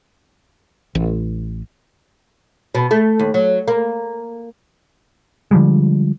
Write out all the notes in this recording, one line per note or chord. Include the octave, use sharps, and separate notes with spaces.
A1
B2
A3
D#2
F#3
A#3
D3 F3 G3 G#3